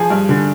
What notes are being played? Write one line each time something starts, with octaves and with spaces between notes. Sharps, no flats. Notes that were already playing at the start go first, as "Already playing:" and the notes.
Already playing: F3 G#4 G#5
G2
D3